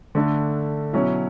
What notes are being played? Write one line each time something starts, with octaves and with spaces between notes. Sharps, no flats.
D3 A3 D4
B2 F#3 C#4 E4